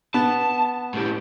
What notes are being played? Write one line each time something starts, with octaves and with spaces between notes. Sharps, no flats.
B3 A5
A2 G4